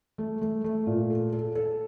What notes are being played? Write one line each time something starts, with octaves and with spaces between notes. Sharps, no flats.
A3
A3
A3
A#2
A4
A4
A4